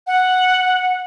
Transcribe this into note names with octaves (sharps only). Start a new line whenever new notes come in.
F#5